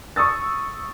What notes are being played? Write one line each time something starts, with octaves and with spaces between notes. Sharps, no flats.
C#6 D#6 E6 A6